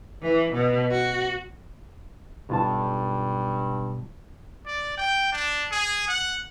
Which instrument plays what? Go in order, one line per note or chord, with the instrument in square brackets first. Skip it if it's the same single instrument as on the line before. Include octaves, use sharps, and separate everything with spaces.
[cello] E3
B2
F#4
[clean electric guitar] B1 F4 A5 [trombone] G2
[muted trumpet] D5
G5
D4
G#4
F#5